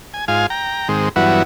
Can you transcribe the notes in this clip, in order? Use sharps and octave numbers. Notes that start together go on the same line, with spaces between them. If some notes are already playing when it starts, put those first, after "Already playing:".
G#5
G#2 F4 F5 G#5
G5 A#5
G#2 D#3 G#3 C4
G2 E3 F#3 B3 E4 F#4